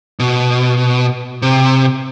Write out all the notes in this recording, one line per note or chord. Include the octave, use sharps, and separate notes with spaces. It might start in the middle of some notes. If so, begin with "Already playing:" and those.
B2
C3